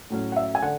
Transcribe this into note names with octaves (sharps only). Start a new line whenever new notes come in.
A2 F#3 C#4
F#5
E5
G#5
D3 F#5